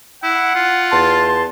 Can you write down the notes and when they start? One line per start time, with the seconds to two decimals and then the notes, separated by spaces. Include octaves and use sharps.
0.23 E4 F#5
0.55 F4
0.91 E2 A5 C6